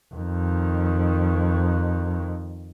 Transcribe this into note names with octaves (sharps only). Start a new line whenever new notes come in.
F2 D#3